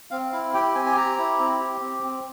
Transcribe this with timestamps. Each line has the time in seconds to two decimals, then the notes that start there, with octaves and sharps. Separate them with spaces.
0.11 C4 F5
0.32 E4 F5
0.54 G4 G5
0.75 C4 G#5
0.86 G#5
0.96 G4 A#5
1.18 E4
1.39 C4
1.60 G4
1.81 C4
2.03 C4